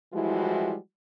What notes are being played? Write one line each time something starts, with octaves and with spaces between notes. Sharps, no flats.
E3 F3 G3 G#3 E4 F#4